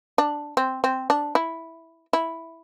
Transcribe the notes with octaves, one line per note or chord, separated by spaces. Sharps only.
D4
C4
C4
D4
E4
E4